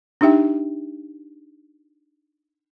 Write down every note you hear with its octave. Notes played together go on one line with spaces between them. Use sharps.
D4 D#4 G4 E5 G5